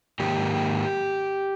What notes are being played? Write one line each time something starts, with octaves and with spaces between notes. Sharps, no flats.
G#2 D#3 A#3 G4